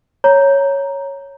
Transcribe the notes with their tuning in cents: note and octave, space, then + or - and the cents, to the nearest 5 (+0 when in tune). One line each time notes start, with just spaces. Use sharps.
C#5 +0 A#5 +0